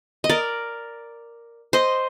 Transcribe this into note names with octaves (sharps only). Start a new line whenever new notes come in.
D#5
A#4 D5
C5 D#5